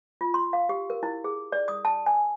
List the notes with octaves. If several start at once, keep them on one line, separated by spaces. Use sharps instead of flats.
F4
C6
F5
G4
A#4
E4
G#4
D5
D#6
A5
G#5